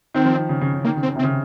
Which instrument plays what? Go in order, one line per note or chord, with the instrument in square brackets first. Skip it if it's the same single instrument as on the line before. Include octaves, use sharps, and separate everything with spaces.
[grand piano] D#3 [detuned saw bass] C4
[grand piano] F3
D#3
C#3
C#3
C#3
[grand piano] D#3 [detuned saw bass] A#3
[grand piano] C#3
[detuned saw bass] C4
[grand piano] C#3
C3
[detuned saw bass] C4
[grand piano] C#3